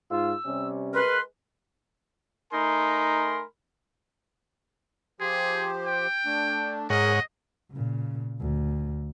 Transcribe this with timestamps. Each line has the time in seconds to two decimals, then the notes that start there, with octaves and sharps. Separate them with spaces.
0.10 G#2 F4 E6
0.46 C3 G3 C#4
0.94 G#3 A#4 B4 C6
2.53 A3 D#4 A#4 G#5 B5 C6
5.20 F3 G4 G#4 C5
5.85 G5
6.25 A3 D4
6.90 G#2 G#4 A#4 C#5 D#5 F#5
7.71 A#2 C#3
8.40 D2